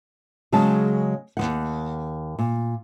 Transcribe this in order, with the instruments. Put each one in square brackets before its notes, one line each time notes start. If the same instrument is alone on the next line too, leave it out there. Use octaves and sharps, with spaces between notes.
[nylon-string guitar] C#3 F#3 G#3 C#4 A5
D#2 F3 F#5
A#2